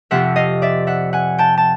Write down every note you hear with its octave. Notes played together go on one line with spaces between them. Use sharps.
F2 C3 F3 E5 F#5
D#5 F5
D5 E5
E5 F#5
F#5 G#5
G5 A5
A5